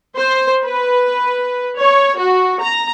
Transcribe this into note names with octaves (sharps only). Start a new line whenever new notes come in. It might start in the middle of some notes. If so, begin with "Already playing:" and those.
C5
B4
C#5
F#4
A#5